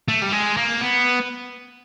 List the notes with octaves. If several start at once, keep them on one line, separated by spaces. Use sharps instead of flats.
A3
G3
G#3
A#3
B3